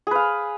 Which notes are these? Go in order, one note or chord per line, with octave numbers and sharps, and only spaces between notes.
G#4 B4 F5